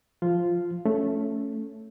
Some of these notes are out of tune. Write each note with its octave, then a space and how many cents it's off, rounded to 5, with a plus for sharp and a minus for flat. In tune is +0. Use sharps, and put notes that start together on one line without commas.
F3 +0 F4 -5
A3 +0 C#4 +0